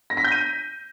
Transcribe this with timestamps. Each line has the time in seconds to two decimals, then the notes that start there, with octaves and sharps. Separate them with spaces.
0.10 A#6
0.17 B6
0.24 G6
0.32 D#7